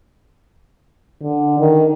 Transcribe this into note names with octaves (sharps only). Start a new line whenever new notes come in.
D3
D#3